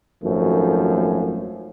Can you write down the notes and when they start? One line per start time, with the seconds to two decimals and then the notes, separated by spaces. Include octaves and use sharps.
0.24 G#1 F#2 F3 A3